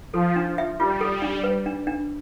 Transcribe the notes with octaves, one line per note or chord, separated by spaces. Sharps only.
F3 A4
D4
E5
G3 F4
A4
D4
B4
D4
D4